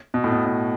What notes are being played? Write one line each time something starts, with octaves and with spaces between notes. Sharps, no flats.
B2
A2
B2
B2